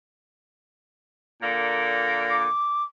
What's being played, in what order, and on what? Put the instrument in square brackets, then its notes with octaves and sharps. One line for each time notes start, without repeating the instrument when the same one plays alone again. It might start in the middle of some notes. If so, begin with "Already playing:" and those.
[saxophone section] A#2 D3 A#3
[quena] D6